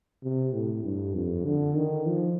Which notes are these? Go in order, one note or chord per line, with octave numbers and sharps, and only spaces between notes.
C3
A2
G2
F2
D3
D#3
F3